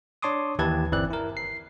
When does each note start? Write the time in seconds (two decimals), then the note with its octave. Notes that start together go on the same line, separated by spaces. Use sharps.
0.22 D4 C#5 A5 C6 D6 D#6
0.59 D#2 E3 G4 B4 A5 G#6
0.92 G1 E3 C4 D5 F#6
1.11 E4 A#4
1.37 C7